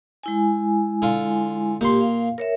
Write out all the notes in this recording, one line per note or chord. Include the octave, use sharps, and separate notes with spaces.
G#3 E4 G#5
D3 F4
A#2 G4 C6
F5
A#4 C#5 E5